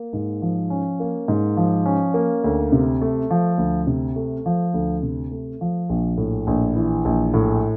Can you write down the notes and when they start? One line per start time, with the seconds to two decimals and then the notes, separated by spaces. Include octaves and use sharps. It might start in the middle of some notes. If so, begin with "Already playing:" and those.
Already playing: A#3
0.13 G#2
0.42 F3
0.70 C#4
1.00 A#3
1.28 G#2
1.57 F3
1.86 C#4
2.14 A#3
2.44 D2
2.72 C3
3.01 A3
3.30 F3
3.58 D2
3.87 C3
4.16 A3
4.46 F3
4.74 D2
5.03 C3
5.31 A3
5.61 F3
5.89 A#1
6.18 A2
6.47 A#1
6.76 E3
7.05 A#1
7.34 A2